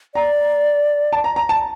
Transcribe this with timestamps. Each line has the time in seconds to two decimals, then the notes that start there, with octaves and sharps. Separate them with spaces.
0.15 D5 A#5
1.13 A5
1.24 A#5
1.36 A#5
1.49 A5